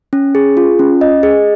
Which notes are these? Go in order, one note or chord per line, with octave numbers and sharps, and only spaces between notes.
C#4
G#4
F4
C#4
D#5
G#4